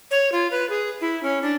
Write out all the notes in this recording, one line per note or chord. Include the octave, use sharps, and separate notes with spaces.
C#5
F4
B4
G#4
E4
C#4
D4